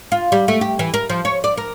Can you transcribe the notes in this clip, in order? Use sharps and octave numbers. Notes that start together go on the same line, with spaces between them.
F4
G3
A3
G4
E3
A#4
F3
C#5
D5
A#4